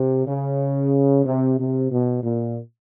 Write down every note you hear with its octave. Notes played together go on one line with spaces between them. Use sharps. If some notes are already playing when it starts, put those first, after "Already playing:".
Already playing: C3
C#3
C3
C3
B2
A#2